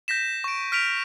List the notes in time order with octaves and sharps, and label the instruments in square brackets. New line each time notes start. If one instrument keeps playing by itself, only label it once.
[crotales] G6 A#6 B6 E7
C#6 D7
F6 B6 D7 F7